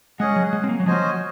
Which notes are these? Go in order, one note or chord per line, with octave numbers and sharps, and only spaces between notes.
G#3 C#4 G#4 D#5 F#5
F#3
G#3
C4
A#3
F#3
F3 C#4 F#4 C5 D#5 G#5